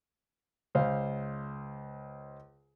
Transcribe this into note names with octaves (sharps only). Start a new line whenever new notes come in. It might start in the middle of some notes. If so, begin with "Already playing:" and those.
C#2 C5 F5